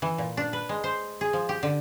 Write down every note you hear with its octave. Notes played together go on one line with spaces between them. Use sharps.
E3
A#2
D4
B4
G#3
C5
G#4
F3
G4
D3